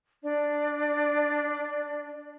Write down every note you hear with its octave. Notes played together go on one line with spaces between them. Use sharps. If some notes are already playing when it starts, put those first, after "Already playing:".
D4 D5